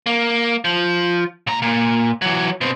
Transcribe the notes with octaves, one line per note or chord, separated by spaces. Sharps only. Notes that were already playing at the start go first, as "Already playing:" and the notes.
A#3
F3
A#2 A#5
A#2
E3 F#3
B2 C4